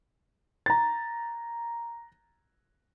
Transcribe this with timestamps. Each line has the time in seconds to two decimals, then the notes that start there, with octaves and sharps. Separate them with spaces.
0.66 A#5 A6